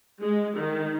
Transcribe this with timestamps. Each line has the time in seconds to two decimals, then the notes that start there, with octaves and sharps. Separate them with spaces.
0.22 G#3
0.56 D#3